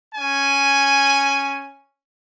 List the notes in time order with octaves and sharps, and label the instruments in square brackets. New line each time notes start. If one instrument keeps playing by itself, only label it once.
[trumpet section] C#4 G#5